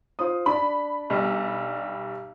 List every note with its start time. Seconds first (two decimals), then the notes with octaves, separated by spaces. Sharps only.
0.19 F4 C5 D#6
0.46 D4 D5 B5
1.10 B1 G3